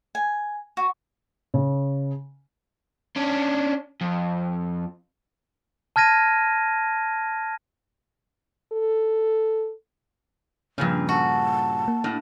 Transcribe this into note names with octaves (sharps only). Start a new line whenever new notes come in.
G#5
F#4
C#3
C#4 D4
F2
A5 F6 G#6 A#6 D#7
A4
G2 A#2 C#3 F3 C#4
F#4 A5
A#3
A2 D4